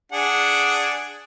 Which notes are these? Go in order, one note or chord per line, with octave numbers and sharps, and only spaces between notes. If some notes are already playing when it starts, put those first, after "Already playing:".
D4 G#4 F#5